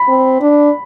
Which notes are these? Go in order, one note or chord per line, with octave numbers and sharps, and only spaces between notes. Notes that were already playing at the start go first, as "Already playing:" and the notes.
Already playing: B5
C4
D4